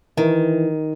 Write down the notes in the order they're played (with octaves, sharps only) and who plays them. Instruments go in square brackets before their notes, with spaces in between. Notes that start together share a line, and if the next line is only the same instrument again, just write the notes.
[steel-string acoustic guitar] D#3 [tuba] E3